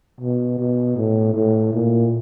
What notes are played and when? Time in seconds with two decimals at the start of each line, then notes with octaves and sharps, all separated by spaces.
0.21 B2
0.59 B2
0.97 A2
1.35 A2
1.73 A#2